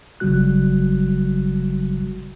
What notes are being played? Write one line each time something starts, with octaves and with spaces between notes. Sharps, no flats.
G1 C#3 F#3 G3 F#4 F#6